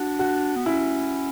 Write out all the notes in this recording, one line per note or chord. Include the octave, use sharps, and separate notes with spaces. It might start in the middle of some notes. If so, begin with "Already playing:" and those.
Already playing: D4 F#4
F#4
B3
C#4 E4